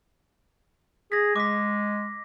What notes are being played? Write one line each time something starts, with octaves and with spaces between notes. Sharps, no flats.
G#4 A#6 B6
G#3 D6 B6